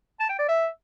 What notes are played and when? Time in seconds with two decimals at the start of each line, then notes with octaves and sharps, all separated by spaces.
0.20 A5
0.29 G5
0.39 D5
0.48 E5